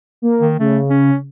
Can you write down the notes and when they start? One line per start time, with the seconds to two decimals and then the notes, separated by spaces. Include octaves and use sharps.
0.22 A#3
0.41 D#3
0.59 C#3 A3
0.90 C#4